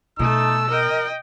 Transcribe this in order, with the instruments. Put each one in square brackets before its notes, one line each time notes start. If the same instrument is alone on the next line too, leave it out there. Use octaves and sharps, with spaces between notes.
[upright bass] B2 [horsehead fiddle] A3 A5 [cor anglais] D#4 [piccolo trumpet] E6
[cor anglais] A#4 [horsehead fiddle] D#5 G5